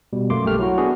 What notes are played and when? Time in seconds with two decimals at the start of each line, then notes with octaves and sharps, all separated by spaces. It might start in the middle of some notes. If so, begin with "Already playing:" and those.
0.13 B2 G3
0.30 F#2 A3 A#3 C6 D6
0.45 B1 A3 G4 F6
0.59 F#3 E4 F#4
0.77 B3 D4 F#4 G#4